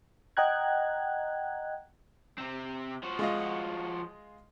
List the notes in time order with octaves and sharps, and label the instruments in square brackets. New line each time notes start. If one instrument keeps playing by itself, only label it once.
[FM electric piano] D#5 F#5 G5 A#5 F#6 G#6
[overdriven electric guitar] C3 C4
F3 F#4
[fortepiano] G#3 F4 D#5